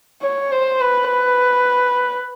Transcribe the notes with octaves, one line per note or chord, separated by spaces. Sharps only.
C#5
C5
B4
B4